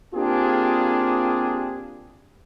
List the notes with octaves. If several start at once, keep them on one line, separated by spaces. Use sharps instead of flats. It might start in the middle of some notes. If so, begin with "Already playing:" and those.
A#3 C4 D4 F4 G4 G#4